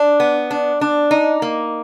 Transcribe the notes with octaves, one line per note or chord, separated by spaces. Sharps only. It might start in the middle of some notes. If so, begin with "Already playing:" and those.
Already playing: D4
B3
D4
D4
D#4
A#3